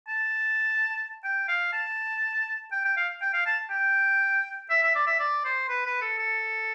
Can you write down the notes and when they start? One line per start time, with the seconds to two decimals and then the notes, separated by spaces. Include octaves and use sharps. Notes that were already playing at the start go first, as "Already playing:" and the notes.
0.08 A5
1.24 G5
1.48 F5
1.73 A5
2.72 G5
2.85 G5
2.97 F5
3.22 G5
3.34 F5
3.46 A5
3.71 G5
4.70 E5
4.83 E5
4.96 D5
5.07 E5
5.20 D5
5.45 C5
5.69 B4
5.86 B4
6.02 A4
6.18 A4